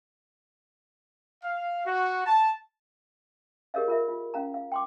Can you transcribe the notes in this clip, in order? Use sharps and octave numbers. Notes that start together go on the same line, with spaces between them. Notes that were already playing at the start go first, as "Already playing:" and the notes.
F5
F#4
A5
G4 G#4 A#4 C#5 D#5 F5
F4 A#4 E5
F4
C#4 F5 A#5
F5
G5 C6 D6